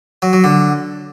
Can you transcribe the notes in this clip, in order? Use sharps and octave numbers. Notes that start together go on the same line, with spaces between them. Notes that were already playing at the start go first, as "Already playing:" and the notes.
F#3
F#3
D3